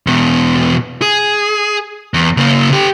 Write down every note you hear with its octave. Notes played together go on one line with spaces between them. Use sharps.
E2 B2
G#4
E2
C#3 A#3
D3 G4